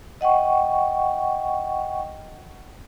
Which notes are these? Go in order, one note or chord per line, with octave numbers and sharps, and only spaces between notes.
D#5 F#5 G5 C#6